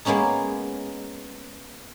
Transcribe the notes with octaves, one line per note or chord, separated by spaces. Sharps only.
G#3 A#3 B3 C#4 D#4